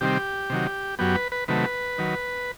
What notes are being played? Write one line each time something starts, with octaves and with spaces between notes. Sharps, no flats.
C3 D#3 G3 C4 G4
C3 D#3 F#3
F#2 F#3 B3 G4
B4
B4
C3 D#3 F#3 A3 B4
D#3 F#3